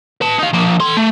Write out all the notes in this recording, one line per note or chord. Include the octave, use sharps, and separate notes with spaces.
B4 A5
D#4 F5
F3 A#3
A4 C6
A3